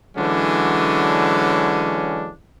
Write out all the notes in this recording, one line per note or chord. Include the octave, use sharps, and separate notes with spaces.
D3 E3 F#3 G#3 C#4 D4